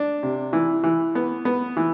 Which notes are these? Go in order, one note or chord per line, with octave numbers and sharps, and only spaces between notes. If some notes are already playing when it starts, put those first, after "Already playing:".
Already playing: D4
C3
E3
E3
B3
B3
E3